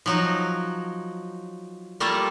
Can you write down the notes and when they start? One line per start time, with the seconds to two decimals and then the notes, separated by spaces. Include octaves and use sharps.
0.06 F3 F#3 D#4
2.00 G3 A3 A#3 F4 A4